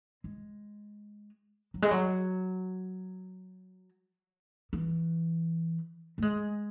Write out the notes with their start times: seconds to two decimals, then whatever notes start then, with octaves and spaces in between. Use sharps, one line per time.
0.24 G#3
1.74 F#3
1.82 G#3
1.91 F#3
4.73 E3
6.18 A3
6.22 G#3